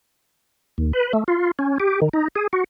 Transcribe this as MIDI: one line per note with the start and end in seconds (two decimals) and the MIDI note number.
0.78 0.92 39
0.93 1.13 71
1.13 1.24 57
1.28 1.51 65
1.59 1.78 61
1.80 2.00 67
2.02 2.09 51
2.13 2.28 63
2.36 2.47 68
2.53 2.64 66